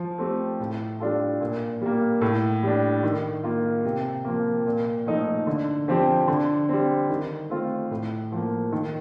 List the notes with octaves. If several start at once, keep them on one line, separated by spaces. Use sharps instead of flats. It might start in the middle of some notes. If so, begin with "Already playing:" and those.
Already playing: F3
A3 C4 G4
A2
G3 D4 F4 A4
A#2
G3 A#3
A2
G3 D4
D#3
A#3 F4
C3
F3 A#3
A#2
F3 A3 D#4
D3
F3 C4 G4
D3
G3 C4
D#3
A3 C4 F4
A2
F3 A#3
D#3